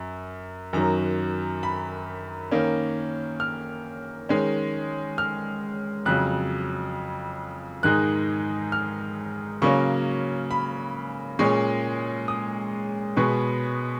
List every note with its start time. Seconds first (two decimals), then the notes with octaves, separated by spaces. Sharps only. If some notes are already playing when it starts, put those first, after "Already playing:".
Already playing: F#2
0.73 F#2 D#3 F#3 A#5
1.63 B5
2.51 D#3 A#3 C#4
3.40 F6
4.29 D#3 G#3 C#4
5.18 F6
6.06 F2 C#3 F#3 F#6
7.83 G#2 D#3 G#3 D#4 F#6
8.72 F6
9.62 C#3 F#3 A#3 C#4 C#6
10.51 B5
11.39 A#2 G#3 C#4 C#6
12.28 D#6
13.16 B2 G#3 B3 C#6